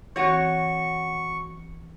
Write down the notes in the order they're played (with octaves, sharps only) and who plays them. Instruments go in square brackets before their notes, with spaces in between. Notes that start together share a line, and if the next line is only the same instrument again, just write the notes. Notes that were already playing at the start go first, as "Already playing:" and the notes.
[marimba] E3 C4 F#6 [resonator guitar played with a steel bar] F#4 C#5 [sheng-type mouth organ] C#6